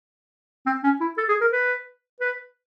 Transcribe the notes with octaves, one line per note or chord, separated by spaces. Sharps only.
C4
C#4
E4
A4
G#4
A#4
B4
B4